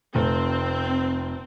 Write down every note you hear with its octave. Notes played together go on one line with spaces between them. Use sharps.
F1 C4